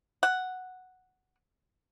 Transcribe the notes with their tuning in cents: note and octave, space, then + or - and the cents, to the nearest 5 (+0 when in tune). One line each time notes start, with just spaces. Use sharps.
F#5 +0